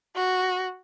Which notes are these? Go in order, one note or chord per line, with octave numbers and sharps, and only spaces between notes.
F#4